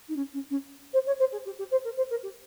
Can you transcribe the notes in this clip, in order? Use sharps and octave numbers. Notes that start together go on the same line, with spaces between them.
D#4
C#4
C#4
C#4
C5
C#5
C5
G#4
G4
G4
C5
A#4
C5
A#4
G4